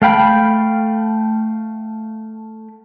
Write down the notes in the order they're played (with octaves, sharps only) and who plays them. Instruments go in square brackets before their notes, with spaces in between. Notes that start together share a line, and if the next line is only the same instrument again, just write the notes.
[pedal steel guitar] A3 F5 G5 B5